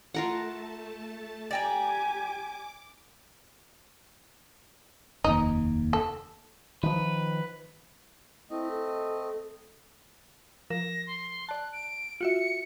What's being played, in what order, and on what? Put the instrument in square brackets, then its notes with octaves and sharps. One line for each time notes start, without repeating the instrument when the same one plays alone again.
[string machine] A3 A5 [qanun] F4 A#4 F#5
[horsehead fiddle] G4 G#5 [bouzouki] D5 G5 A#5 [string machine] D6
[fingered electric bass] F1 D#2 [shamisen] D#4
[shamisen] A4
[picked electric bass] D#3 F3 [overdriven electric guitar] B4
[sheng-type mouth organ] A3 C4 D#5 [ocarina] E4
[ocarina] A4
[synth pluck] F3 A#4 E7 [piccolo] A#6
[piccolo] C6
[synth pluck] D5 A5 [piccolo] F#6
[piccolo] D7
[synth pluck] F4 F#4 E5 [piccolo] C#7